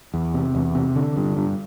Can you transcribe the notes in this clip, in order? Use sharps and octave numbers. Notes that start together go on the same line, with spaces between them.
E2
C3
E2
C3
D3
G2
G2